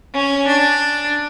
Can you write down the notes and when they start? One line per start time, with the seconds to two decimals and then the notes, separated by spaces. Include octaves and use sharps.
0.14 C#4
0.47 D4